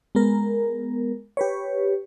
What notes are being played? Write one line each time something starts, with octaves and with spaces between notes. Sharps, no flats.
G#3 B3 A#4
G4 B4 C#5